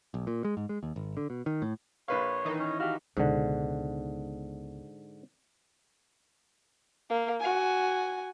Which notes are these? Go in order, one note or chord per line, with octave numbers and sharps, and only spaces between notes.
B1
A#2
G#3
G#2
G#3
D#2
G#1
D3
B2
D#3
A2
A#1 B4 C#5 F5
D#3 E3 D#4
C#4
F#4 G4 F5
C#2 G#2 B2 D3
A#3
F#4 G#5